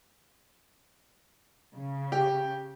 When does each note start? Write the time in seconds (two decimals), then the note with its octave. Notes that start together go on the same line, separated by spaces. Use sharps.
1.74 C#3
2.12 G4